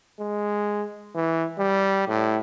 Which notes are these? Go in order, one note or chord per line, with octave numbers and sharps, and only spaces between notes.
G#3
E3
G3
A2